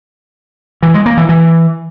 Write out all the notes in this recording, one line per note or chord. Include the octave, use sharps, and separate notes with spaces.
E3
G#3
A#3
E3
E3